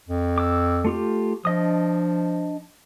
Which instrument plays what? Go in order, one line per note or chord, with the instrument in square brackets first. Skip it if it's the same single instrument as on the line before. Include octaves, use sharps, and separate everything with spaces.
[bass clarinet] F2
[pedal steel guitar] D6 E6
A3 F4 G4
[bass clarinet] F3 [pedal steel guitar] D4 D#5 D#6